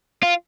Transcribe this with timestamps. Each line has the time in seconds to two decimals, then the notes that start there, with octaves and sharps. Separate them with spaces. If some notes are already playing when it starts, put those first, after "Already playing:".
0.23 F4